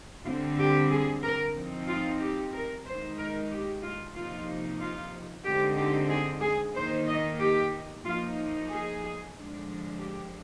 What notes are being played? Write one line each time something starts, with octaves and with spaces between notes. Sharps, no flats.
D3 G3 C4 F4
G4
G#4
A#4
F3 C4 D#4
F4
G4
A#4
D#3 G#3 D#4 C5
A#4
G4
F4
C3 F3 A#3 D#4 F4
F4
D3 G#3 C4 D#4 G4
G4
G#4
G#4
D#3 A#3 D#4 C5
D#5
G4
F3 A#3 D#4 F4
G#4
D3 F3 G#3 D4
G4